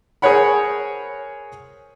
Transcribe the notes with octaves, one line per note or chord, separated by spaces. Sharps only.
G#4 A#4 C5 C#5 F#5 B5